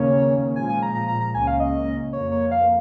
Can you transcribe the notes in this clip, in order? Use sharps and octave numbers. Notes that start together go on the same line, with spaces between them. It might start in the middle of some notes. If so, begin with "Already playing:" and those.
Already playing: D#2 C#3 A#3 C#4 C#5
A#2 F3 G#3 G#5
G#5
A#5
A#5
A#5
A#5
C#2 C#3 A#3 C#4 G#5
F5
D#5
F2 F3 A#3 C#5
C#5
F5